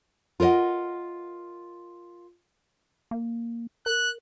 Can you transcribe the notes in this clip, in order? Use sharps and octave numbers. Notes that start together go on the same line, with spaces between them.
F4 A#4 B4 D#5 F#5
A#3
A#4 F#6